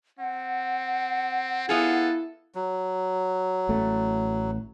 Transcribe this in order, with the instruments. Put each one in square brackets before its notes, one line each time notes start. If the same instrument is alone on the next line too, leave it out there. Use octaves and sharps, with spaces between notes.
[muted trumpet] C4 [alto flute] F#5
[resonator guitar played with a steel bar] B3 F4 G#4 [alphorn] E4 [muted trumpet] A4
[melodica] F#3
[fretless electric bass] A1 A3